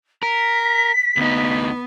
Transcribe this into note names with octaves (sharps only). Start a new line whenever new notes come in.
A#4 B6
D2 B3 D#4